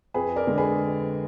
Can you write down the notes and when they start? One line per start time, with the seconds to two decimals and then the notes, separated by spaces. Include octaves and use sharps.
0.14 F2 G#4 B4
0.36 A#4 D5
0.47 D3 G#3
0.58 G#4 B4